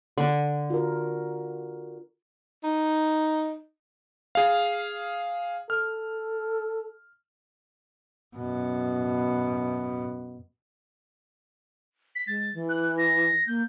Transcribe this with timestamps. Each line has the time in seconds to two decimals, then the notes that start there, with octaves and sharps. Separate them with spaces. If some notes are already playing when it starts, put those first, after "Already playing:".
0.18 D3
0.70 F4 F#4 A#4
2.64 D#4
4.35 G#4 F5
5.70 A4 F6
8.37 F#2 B2
12.15 B6
12.27 G#3 A6
12.54 E3
12.69 F#6
12.98 A#6
13.47 A#3 G6